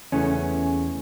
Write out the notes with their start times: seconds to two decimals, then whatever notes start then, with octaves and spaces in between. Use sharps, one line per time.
0.12 E2 C#3 E3 A3 C#4